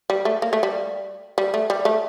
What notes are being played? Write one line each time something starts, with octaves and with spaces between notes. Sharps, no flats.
G3
A3
A#3
A3
G3
G3
A3
G3
A3